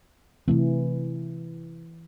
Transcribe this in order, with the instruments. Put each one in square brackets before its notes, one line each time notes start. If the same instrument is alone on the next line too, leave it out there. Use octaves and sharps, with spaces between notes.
[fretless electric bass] C3 A3 C4 [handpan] E3